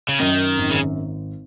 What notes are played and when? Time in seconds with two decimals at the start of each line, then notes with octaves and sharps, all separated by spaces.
0.09 C#3
0.19 F#2 D#3
0.58 G#1
0.71 C#3